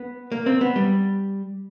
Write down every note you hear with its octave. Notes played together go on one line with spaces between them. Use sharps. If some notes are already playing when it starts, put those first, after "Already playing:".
Already playing: B3
A#3
C4
B3
G3